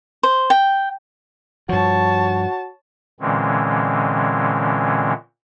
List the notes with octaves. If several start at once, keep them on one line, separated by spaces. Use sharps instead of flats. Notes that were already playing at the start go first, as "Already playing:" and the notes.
C5
G5
G2 F3 F#4 C#5 A5
A#2 D3 E3 G#3 C4 C#4